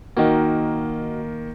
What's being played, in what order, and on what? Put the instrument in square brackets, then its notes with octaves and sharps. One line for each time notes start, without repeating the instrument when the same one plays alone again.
[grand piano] D#3 A#3 [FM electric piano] D#4 F#4